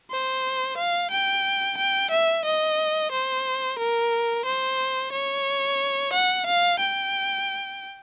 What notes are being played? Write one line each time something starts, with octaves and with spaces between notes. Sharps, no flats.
C5
F5
G5
G5
E5
D#5
C5
A#4
C5
C#5
F#5
F5
G5